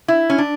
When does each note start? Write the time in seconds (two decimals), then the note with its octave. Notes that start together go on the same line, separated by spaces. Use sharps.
0.08 E4
0.30 C#4
0.38 D4